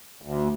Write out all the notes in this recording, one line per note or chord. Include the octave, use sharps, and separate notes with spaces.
D2